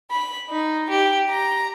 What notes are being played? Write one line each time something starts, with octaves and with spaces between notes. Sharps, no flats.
B5
D#4
G4
A#5